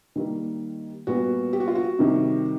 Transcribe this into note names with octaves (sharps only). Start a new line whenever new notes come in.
D#3 G3 A#3
A#2 G3 B3 F#4
G4
F#4
F4
F#4
C3 D#3 G3